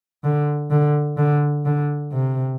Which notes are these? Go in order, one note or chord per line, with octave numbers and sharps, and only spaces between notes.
D3
D3
D3
D3
C3